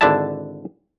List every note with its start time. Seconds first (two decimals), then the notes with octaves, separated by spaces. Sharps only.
0.01 G#1 D3 D4 E4 E5 A5